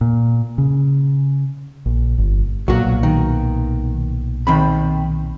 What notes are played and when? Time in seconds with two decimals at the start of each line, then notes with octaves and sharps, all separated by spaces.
0.01 A#2
0.58 C#3
1.86 A#1
2.18 G1
2.68 B1 A#2 F#3 F#4
3.03 D#3
4.47 D#3 C4 B5